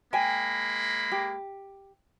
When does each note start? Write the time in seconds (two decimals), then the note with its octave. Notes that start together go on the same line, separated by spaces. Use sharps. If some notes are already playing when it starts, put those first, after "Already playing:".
0.13 G#3 A#3 G5 G#5 B5
1.12 G4